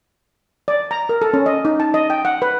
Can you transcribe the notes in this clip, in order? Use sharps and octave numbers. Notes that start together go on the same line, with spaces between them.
D5
A#5
A#4
A4
C#4
D#5
D#4
A5
D#5
G5
F#5
B4